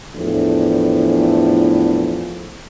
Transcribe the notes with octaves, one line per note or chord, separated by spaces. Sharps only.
E2 A2 E3 F3 A3 D4